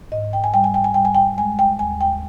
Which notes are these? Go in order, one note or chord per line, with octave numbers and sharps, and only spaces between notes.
G#2 D#5
G5
G#5
G3 G5
G#5
G5
G#5
G3 G5
G#5
G5
G#3 G#5
G5
D#2 G#5
G5